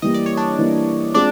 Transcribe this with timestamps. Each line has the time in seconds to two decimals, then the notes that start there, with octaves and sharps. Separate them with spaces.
0.02 E3 G3 A#3 D#5
0.14 D5
0.26 C#5
0.37 D4 D5
0.59 E3 G3 A#3
1.14 G#3 C4 D4 F4 D5